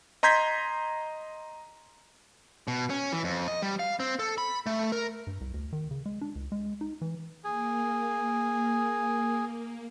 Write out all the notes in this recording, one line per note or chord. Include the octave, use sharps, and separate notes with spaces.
D#5 A#5 C6 G6 G#6 B6
B2
C#4
E3
F2
D#5
G3
F5
C4
A4
B5
A3
A#4
G2
C2
D2
D#3
C#3
G#3
D4
C#2
G#3
D#4
E3
A#3 G#4